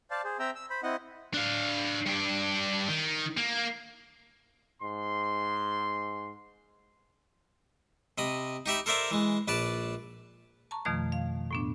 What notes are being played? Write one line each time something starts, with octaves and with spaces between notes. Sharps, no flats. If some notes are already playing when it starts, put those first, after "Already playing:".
C5 D5 F5 A5
G#4 C5
C4 E5 G5 A#5 E6
E6
C5 B5
C4 E4 D#5 F#5
D4 F5
G2 D4
D#3
A#3
G#2 C6
C3 D#5 B5
D#4 G4 E5 B5
A4 A#4 C5 D5 E5 A#5
E3 G#3
A#1 B4 D5 A5
A5 A#5 C#6
F2 B2 D#3 F3 A3 F6
F5
A2 B3 D4